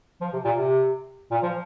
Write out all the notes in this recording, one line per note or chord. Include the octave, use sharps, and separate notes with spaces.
F3
C3
A#2
C3
A#2
F3